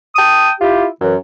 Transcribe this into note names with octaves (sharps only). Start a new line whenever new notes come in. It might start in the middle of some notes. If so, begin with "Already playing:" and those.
G5 A5 D#6
E4 F4 G4
F#2 E3